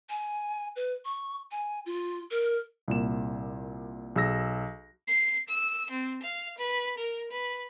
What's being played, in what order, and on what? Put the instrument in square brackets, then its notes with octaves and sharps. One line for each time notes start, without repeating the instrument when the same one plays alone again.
[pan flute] G#5
B4
C#6
G#5
F4
A#4
[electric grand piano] C2 A#2 E7
B1 G#4 E6 A#6
[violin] C7
E6
C4
F5
B4
A#4
B4